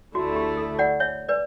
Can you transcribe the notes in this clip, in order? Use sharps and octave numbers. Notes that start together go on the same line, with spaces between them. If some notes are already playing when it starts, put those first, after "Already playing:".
D2 D3 A3 E4 F#4
G4
A4
D5 F#5
C#5 E5
B4 D5